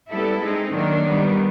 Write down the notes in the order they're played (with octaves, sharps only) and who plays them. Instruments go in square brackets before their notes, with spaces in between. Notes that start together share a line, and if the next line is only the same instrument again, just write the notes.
[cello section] G3 B3 E4 A4
G#3 C4 D#4
D#3 F#3 A#3 D4
D#3 G3 B3